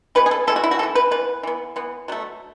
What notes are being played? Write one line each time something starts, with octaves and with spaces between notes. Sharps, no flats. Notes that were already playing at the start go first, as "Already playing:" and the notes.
E3 G#3 B3 B4
G#4
A4
E3 G#3 B3 A4
F#4
E4
F#4
E3 B3 A4
B4
E3 B3 B4
E3 B3
E3 B3
B2 F#3 A3